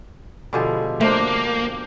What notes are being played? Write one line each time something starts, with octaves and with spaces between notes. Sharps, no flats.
B2 D3 F3 G3 G#3 G#5
A3 A#3 D4 C5 G5